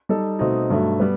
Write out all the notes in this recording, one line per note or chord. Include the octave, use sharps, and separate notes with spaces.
G3 D#4 A4
B2 A3 C4 D#4
G2 F#3 A3
G3 B3